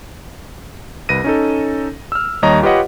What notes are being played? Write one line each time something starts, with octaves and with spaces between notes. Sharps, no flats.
C2 B4 A#6 D#7
C#4 D#4 A4
E6 F6
D#2 G3 C#5 D#5 A#5
F4 G4 B4 C#5 D#5 F#5